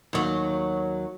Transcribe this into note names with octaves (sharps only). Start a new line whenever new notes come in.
D#2 F#3